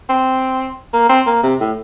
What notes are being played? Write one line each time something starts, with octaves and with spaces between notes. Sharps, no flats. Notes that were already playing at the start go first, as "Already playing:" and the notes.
C4
A#3
C4
A#3
C3
A2